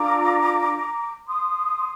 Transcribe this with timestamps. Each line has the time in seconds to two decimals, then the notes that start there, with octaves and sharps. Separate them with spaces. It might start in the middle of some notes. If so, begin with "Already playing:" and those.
Already playing: D4 F4 A4 A#5 D6
1.27 C6 D#6